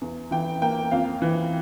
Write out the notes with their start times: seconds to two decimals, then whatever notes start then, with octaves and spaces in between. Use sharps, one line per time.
0.01 E2
0.31 E3 G5
0.62 A#3 G5
0.91 F2 F5
1.22 E3